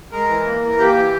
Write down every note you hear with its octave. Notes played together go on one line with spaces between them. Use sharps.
G#3 A#4
E3
A#3
E3
A#3 G4
E3